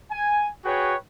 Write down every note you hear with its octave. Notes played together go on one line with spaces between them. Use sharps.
G#5
F#4 G#4 B4 C#5 G5